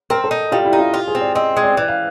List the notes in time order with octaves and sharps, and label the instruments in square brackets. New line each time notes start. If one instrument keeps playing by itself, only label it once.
[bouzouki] C4 [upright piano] A#4
[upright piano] A4
[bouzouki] D#4
[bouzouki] G3 [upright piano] F4
[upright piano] E4
[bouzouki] D#4
[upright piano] F4
[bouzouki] F4 [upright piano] G4
[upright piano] G#4
[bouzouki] C4
[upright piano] D5
[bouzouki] C4 [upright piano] D#5
[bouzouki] G#3
[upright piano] D5
[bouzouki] E3 [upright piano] D5
[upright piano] F5